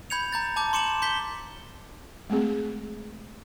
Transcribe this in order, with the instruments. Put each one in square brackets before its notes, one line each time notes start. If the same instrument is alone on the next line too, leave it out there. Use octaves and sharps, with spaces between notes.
[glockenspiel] B5 G6 G#6 C#7 F7
A#5 G6 A6
A5 D6 G6
C6 D6 C#7 E7 F#7
C6 G6 B6 G7
[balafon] G#3 A3 C4 G#4